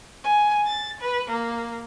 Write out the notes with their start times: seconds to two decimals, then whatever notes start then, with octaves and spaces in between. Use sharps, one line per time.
0.23 G#5
0.67 A6
1.01 B4
1.30 A#3